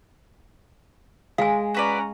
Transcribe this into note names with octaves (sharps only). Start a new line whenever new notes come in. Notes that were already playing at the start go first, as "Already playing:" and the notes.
G#3 F5 G#5
C#4 F#4 B4 D5 A#5